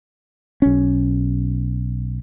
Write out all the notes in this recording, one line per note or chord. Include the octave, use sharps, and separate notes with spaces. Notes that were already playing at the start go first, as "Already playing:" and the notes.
B1 C#4